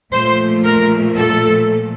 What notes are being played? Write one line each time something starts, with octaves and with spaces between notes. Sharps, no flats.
A#2 F3 A3 C5
A#4
A4